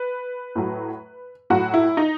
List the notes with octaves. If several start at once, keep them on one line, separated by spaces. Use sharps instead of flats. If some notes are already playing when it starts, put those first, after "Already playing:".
Already playing: B4
A2 F#3
A2 F#3 F#4
E4
D#4